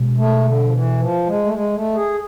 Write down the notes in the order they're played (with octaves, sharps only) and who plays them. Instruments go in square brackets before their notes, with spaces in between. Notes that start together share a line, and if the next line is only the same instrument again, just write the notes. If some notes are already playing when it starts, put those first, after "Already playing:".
Already playing: [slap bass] B2 G#3 D4
[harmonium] A3
D3
F3
E3
F3
G#3
A3
G#3
A3
G#4